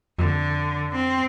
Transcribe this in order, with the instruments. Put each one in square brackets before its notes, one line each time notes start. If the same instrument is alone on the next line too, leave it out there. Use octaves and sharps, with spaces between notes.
[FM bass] F2 [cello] D3
[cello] C4